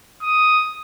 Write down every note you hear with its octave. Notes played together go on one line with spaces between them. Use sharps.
D#6